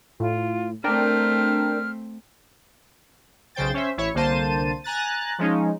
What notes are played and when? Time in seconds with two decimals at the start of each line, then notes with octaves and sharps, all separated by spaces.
0.20 A2 F4
0.84 A3 C4 D4 A#4 G5 F6
3.55 B1 C#3 C5 G5 A6
3.74 C#4 C5 E5
3.97 A1 E4 C#5
4.14 C2 D3 A#3 C5 A5 D#7
4.84 G#5 A#5 F#6 A6
5.38 F3 G#3 C#4 D#4